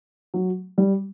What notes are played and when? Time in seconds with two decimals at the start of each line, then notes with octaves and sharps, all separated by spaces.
0.34 F#3
0.78 G3